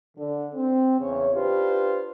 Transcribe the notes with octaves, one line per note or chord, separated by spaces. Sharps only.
D3
C4
E2 C#3 C#5
D4 F4 G4 B4 C5